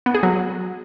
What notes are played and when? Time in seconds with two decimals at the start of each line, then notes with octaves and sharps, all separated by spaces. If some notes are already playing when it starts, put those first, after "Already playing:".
0.06 B3
0.15 G#4
0.23 F#3